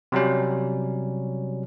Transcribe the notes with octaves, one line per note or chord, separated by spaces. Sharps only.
C3 F#3 G3 C#4